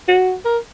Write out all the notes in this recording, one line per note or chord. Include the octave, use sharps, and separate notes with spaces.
F#4
A#4